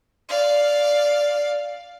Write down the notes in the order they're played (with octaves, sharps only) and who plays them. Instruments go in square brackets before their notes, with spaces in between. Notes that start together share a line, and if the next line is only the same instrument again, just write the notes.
[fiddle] D5 F5